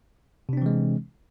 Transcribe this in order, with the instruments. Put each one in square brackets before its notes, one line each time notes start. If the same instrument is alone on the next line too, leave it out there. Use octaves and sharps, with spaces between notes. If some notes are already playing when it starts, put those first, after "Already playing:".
[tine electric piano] C3
D4
C4
E3
G#3